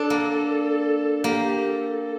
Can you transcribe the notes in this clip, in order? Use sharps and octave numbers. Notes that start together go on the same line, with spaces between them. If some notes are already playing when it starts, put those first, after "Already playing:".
Already playing: D4 A4
A#3
A4
A#3 G4
A4